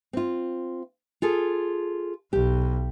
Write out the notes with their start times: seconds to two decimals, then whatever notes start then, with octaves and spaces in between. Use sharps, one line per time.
0.13 C4 F4
1.22 F4 G#4 A4
2.33 B1 G4